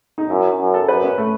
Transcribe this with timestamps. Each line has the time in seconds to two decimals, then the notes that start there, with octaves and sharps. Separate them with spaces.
0.18 D#4
0.29 F#2 E4
0.59 F#2
0.74 A4
0.88 F#2 B4
1.03 C#4
1.18 A3